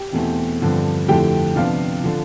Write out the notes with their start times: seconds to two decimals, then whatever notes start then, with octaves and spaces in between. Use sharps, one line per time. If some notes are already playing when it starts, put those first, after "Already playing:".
Already playing: G4 G5
0.12 E2 B2 A3 C4 E4
0.61 G2 D3 F3 C4
1.08 F2 D3 A3 C4 E4 G4 G5
1.56 C3 F3 B3 D4 F4 F5
2.04 D3 F3